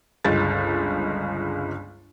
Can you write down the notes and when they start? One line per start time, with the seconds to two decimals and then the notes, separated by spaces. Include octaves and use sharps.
0.25 G1 C#2 G#3 A6